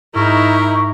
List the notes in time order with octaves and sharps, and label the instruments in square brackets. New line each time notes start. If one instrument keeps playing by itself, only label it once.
[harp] G#2 [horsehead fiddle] D#4 E4 [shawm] A#4 [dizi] C#6